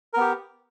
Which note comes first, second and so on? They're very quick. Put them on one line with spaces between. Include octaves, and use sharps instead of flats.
A#4 B3 G4